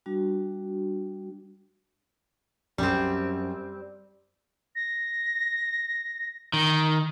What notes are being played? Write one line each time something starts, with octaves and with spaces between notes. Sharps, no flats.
G3 D4 F#4
F#2 G3 C4
A#6
D#3